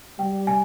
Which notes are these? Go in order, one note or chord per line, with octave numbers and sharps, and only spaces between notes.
G3 G5
G#5